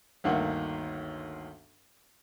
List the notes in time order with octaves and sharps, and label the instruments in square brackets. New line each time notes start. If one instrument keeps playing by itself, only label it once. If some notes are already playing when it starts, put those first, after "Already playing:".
[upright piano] G1 D2 D#3 A#3 F#5